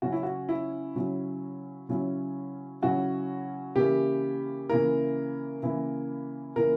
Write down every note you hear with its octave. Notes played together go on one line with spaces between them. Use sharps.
C#3 F#3 C#4 E4 F#4
E4
F#4
E4
C#3 F#3 C#4 E4
C#3 F#3 C#4 E4
C#3 F#3 C#4 E4 F#4
C#3 E3 A#3 E4 G4
C#3 E3 A#3 E4 A#4
C#3 E3 A#3 E4
C#3 E3 A#3 E4 A#4